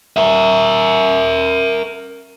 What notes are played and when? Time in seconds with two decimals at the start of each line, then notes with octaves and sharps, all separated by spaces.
0.17 A#4 E5